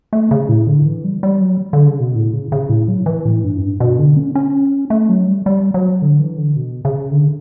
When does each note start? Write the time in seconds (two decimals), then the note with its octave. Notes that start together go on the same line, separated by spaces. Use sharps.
0.13 A3
0.31 C#3
0.49 A2
0.67 D3
0.86 E3
1.04 G3
1.23 G3
1.41 F#3
1.73 D3
1.87 C#3
2.00 B2
2.15 A2
2.33 C#3
2.52 C#3
2.69 A2
2.88 F#3
3.06 E3
3.25 A2
3.44 G2
3.57 F#2
3.62 G2
3.80 B2
3.99 D3
4.17 C#4
4.35 C#4
4.90 A3
5.09 F#3
5.28 G3
5.46 G3
5.74 F#3
6.02 D3
6.20 E3
6.38 D3
6.56 B2
6.85 C#3
7.11 D3